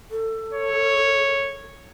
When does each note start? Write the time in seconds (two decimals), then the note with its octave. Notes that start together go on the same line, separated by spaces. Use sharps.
0.11 A4
0.53 C#5